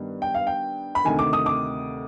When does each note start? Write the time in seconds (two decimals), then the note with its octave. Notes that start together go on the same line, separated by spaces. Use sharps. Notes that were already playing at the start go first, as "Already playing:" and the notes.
Already playing: G2 D#3 G3 B3
0.22 G5
0.34 F5
0.47 G5
0.95 B5
1.04 D2 C3 D#3 G#5
1.19 D6
1.33 D#6
1.46 D6